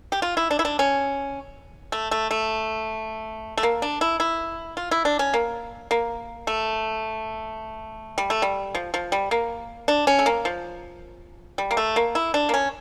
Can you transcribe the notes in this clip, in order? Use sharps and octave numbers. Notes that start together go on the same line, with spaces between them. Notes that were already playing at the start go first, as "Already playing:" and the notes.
G4
F4
E4
D4
E4
D4
C#4
A3
A3
A3
A3
A#3
D4
E4
E4
F4
E4
D4
C#4
A#3
A#3
A3
G3
A3
G3
F3
F3
G3
A#3
D4
C#4
A3
A#3
F3
G3
A#3
A3
A#3
E4
D4
A#3
C#4